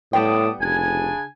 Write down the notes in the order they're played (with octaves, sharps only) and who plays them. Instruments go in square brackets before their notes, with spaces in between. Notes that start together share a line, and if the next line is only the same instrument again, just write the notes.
[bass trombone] A2 [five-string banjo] G3 B3 G5 [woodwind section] A5 D6 D#6
[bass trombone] F1 [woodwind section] C#3 D4 G#5